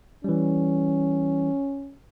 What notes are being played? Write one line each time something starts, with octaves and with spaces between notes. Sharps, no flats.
E3 G3 C#4